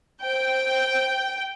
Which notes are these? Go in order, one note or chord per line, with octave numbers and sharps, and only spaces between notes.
C5 G5